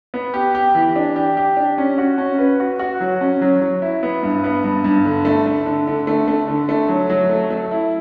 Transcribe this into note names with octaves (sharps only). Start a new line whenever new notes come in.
B3
G4
G4
E3
D4
G4
G4
D4
C#4
F#4
C#4
B4
F#4
F#4
F#3
C#4
F#3
F#3
E4
B3
G2
B3
G2
G2
D3
A3
A3
D3
D3
A3
A3
D3
A3
F#3
F#3
A3
A3
E4